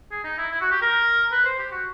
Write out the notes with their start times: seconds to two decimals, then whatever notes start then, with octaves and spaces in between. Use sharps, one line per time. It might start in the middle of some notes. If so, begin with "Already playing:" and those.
0.11 G#4
0.24 D#4
0.38 E4
0.52 E4
0.61 F#4
0.71 G4
0.82 A#4
1.32 B4
1.45 C5
1.58 G4
1.72 F#4